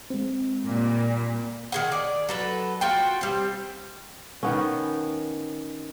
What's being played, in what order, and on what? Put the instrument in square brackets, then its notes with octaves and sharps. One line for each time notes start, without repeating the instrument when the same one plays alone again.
[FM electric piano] G#3 C4
[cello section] A#2 G3
[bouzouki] D#3 G#4 F#5
D5
F#3 A4 B4
F4 F#4 G5
G3 C4
[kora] D#3 B3 C#4